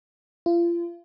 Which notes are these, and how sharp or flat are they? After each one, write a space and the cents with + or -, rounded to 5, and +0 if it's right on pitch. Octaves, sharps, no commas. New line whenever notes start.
F4 -35